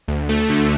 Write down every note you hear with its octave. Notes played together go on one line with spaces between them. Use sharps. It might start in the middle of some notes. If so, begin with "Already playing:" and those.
D2
A3
D3